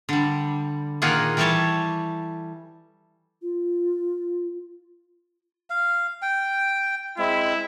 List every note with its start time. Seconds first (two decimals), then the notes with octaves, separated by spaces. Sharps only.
0.09 D3 G3
1.02 A#2 D#3 A#3 F4 G#4 F#5
1.37 E3 G3 G4 A4 C#5 A5
3.42 F4
5.70 F5
6.22 G5
7.18 G#3 C4 E4